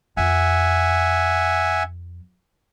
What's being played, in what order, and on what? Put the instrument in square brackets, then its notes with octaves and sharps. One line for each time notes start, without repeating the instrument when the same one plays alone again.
[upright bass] F2 [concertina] E5 F#5 G#5